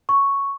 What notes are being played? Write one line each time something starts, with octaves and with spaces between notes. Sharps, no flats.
C#6